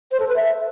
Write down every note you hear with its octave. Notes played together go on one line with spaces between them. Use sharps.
C5
A4
B4
E5